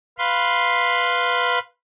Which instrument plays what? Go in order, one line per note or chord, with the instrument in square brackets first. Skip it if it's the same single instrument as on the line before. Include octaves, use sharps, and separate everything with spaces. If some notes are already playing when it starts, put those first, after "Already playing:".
[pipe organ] B4 F5 C6